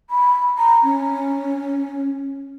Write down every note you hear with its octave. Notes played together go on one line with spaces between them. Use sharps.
B5
A#5
C#4